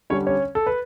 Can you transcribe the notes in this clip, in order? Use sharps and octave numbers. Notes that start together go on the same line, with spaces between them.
D3 G3 C#4 D4 C#5
C#4 C#5
A4
B4